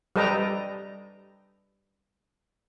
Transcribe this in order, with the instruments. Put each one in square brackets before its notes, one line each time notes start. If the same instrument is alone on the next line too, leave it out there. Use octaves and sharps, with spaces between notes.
[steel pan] G3 A4 B4 D#5 G5 A#5